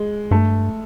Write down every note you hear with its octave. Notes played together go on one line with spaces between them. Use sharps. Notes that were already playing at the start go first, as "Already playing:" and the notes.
Already playing: G#3
G2 A3